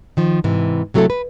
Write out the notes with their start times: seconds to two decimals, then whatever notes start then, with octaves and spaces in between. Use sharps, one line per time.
0.17 D#3 F3
0.44 G#2 C3 E3
0.94 C3 F#3 A3 E4 A4
1.10 B4